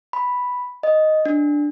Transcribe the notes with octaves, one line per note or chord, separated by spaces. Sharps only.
B5
D#5
D4